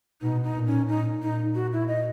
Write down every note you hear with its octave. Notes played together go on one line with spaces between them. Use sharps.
B2 D#4
D#4
A#2
C#4
A#2 D#4
D#4
F#4
E4
D#5